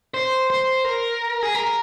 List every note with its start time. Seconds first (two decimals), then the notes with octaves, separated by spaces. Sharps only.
0.14 C5
0.50 C5
0.85 A#4
1.43 G#4
1.55 A#4